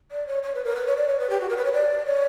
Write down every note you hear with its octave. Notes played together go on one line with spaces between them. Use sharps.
D5
C#5
C#5
B4
A#4
B4
C#5
D5
C#5
B4
G4
F#4
A#4
B4
C#5
D5
C#5